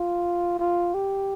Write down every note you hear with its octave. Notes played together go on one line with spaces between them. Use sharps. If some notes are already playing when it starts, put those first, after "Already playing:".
Already playing: F4
F4
G4